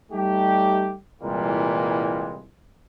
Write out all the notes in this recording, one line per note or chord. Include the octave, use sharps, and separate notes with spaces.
G3 A3 D#4 G4
C2 A#2 E3 G3 G#3 A#3